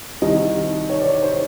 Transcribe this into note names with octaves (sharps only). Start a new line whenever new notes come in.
C2 C3 D#3 D#5
C#5
D5
C#5
C5